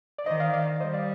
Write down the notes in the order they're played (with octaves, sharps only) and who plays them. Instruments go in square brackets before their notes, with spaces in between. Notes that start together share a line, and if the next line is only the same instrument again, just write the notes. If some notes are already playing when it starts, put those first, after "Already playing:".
[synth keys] D5
[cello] D#3 [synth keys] C5 D#5
[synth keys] D5 F5
D5 F5
[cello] G3 [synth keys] C5 D#5
[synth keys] D5 F5